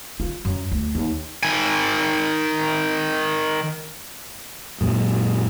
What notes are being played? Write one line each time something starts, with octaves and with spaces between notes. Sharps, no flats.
F4
F#2
D2
D#2
D#3 G#5
F#2 A#2 F#3